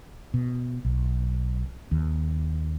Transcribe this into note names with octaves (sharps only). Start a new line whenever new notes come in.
B2
B1
D#2